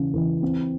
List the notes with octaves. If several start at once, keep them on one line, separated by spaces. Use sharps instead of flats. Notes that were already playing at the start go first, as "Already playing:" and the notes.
Already playing: C#3 E3
E3
C4